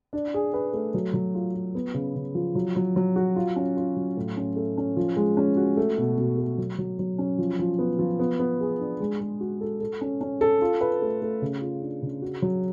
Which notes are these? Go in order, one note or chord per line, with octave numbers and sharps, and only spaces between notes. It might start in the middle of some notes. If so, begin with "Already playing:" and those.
D4
G#4
B4
A3
F#3
F#3
F4
F4
B3
C#3
C#3
F3
F#3
F#3
F#3
F#4
F4
C#4
F4
F#3
A2
C#4
A3
C#4
F3
G#3
C#4
F#4
A3
B2
B2
A3
F#3
F#3
F#3
C#4
F3
F3
B3
F3
B3
B3
G#4
D4
G#3
G#3
F#4
A4
A4
C#4
C#4
A4
F4
B4
A3
A3
C#3
F4
D4
C#3
F#4
F#3